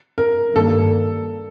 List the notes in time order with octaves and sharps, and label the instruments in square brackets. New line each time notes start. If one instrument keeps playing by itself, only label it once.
[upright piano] A#4
[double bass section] G2 D#3 A#3 [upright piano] A4